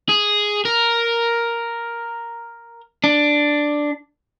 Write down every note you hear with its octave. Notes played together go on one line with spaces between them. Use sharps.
G#4
A#4
D4